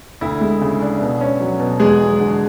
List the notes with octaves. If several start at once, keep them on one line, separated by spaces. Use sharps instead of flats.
D2 E4
G#3
C#3
D4
B2
C#4
F#3
B2
E2 G#3 G#4
F#3
D3